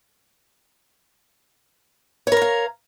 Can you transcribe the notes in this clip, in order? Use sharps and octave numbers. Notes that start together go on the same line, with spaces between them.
A#4 C#5 F5 A#5